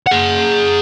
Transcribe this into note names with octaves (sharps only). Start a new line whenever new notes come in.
G#4 F#5